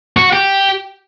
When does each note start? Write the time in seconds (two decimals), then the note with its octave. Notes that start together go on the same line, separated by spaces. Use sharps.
0.17 F#4
0.33 G4